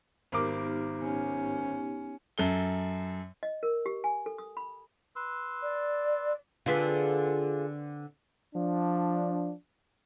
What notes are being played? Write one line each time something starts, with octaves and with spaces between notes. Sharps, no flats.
G#1 B3 D#4 G4 A#4 D6
C#4
F#2 A4 G7
D#5
A#4
G4
G#5
A4
D#6
B5
B4 C6 E6
D5
D3 C4 F4 G#4 A4 B4
F3 D4